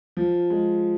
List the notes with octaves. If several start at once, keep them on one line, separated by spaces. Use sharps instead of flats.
F3
G#3